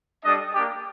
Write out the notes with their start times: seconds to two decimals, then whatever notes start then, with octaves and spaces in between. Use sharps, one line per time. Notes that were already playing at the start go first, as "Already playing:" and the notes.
0.24 G3 D4 A4 D#5
0.53 A#3 D4 G4